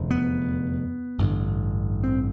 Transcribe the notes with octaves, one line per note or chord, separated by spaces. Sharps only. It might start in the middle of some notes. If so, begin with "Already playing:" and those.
Already playing: F1 E2 D3
B3
A1 G2 D3
C4